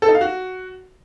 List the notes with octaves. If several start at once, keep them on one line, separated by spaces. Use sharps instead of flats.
A4
D#4
F5
F#4